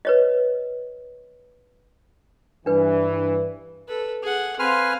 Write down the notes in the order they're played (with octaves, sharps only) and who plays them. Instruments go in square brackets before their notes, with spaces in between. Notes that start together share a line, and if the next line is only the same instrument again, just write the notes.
[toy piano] B4 C#5 D#5
[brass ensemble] G2 E3 [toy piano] D4 B4
[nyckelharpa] A4 B4
G#4 F#5
[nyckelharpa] C4 F5 [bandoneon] B4 G#5 F6 [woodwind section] C6